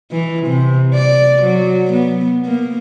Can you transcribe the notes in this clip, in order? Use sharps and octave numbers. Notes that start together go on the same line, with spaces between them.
E3
C3
D5
F#3
B3
A#3